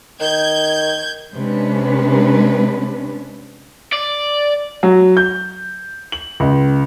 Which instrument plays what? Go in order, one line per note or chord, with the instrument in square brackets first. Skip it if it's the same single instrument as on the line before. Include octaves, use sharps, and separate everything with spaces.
[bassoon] D#3 [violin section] G6 G#6
[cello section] C3 G#3 C#4 D4 B4
[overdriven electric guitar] D5
[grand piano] F#3
G6
F#7
C#2